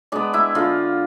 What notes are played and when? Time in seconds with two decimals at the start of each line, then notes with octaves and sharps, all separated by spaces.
0.12 G#3 B3 D4 D5
0.33 E4 E5
0.55 D3 F4 F5